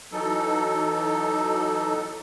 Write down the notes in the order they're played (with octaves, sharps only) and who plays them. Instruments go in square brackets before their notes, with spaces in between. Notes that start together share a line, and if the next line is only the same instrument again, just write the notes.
[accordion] E3 F#3 D#4 A4